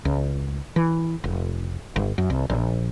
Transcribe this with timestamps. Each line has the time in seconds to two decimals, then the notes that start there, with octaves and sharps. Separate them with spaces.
0.05 C#2
0.76 E3
1.24 F1
1.96 G1
2.18 F#2
2.30 C2
2.50 A#1